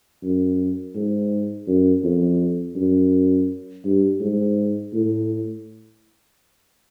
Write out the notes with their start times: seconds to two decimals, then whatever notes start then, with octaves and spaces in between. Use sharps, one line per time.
0.23 F#2
0.95 G#2
1.68 F#2
2.04 F2
2.76 F#2
3.85 G2
4.21 G#2
4.93 A2